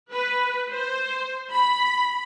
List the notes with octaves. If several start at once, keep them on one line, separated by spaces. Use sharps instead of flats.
B4
C5
B5